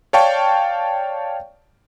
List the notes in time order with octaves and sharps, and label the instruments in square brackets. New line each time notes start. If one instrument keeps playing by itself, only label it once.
[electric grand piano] C#5 D5 F5 G5 A5 C#6